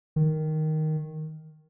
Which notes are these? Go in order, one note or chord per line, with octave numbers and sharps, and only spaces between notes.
D#3